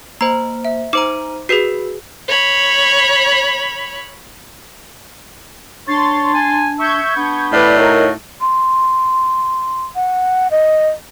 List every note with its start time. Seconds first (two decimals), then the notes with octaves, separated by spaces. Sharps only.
0.21 A#3 C5 A#5
0.65 E5
0.93 D#4 C5 A#5 D6
1.49 F#4 G#4 B4 C7
2.28 C#5 B5
5.88 D4 C#5 C6 A6
6.35 G#5
6.79 E5 C#6 G6 G#6
7.16 B3 D4
7.53 A2 B4 D5
7.76 D#4 F#4 A#4 C#5
8.41 C6
9.95 F#5
10.51 D#5